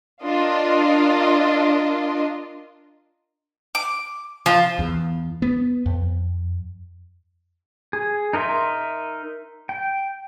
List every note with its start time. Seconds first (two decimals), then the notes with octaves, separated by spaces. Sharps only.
0.23 D4 F4 A#4 D#5
3.75 D6
4.46 F3 F4
4.79 E2
5.42 B3
5.86 F2
7.93 G#4
8.33 D#4 A#4 D#5 E5 C6
9.69 G5